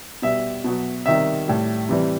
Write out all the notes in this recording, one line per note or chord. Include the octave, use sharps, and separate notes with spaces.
B2 G3 E5
B2 F#3
C3 D#3 G3 E5
A2 G3
C3 E3 G3